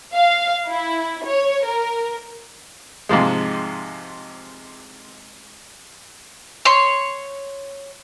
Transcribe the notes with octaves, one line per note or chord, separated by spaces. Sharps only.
F5
E4
C#5
A#4
G#2 C3 F3 G#3
C#5 C6